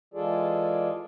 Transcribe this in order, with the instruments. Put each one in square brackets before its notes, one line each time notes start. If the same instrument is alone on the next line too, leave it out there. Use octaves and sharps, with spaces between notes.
[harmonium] E3 G#3 F4 G#4 A4 D5